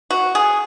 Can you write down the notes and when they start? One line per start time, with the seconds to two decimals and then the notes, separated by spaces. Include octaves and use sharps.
0.10 F#4
0.35 G#4